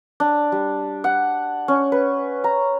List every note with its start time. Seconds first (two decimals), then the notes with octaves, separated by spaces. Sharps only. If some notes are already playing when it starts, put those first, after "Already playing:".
0.20 D4
0.52 G3
1.04 F#5
1.68 C#4
1.92 B4
2.44 A#5